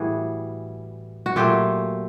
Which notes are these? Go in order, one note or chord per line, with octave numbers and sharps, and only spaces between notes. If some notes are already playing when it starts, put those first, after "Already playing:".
Already playing: A2 E3 G3 F#4 G#4
F#4
A#2 F#3 A3 F4 G4